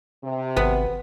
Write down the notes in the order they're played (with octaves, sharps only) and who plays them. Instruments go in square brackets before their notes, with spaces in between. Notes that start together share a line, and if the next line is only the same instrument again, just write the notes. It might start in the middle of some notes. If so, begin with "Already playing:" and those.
[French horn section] C3
[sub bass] G#1 [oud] B3